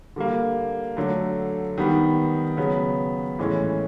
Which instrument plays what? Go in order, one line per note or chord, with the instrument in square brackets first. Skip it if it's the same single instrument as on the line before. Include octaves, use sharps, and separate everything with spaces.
[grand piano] D3 G3 A#3
D3 F#3 A3
D#3 G3 B3
C#3 F#3 B3
A2 E3 G#3 C#4